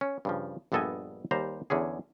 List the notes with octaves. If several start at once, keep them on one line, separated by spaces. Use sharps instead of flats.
C#4
G2 C#3 F3
A#1 G2 B3 A4 D#5 G#5
D#2 G3 C5 A#5
E2 D3 C#4 G#4